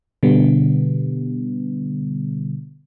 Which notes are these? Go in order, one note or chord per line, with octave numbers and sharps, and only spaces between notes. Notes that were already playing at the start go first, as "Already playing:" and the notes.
B2 D3 G3 B3